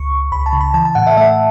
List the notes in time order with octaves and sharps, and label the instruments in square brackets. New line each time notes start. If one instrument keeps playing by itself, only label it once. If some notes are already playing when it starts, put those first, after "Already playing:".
Already playing: [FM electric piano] C#2 C#6
C#2
C#2 B5
A5
C#3
B5
E3 A5
A5
A2 F#5
E5
A3 E5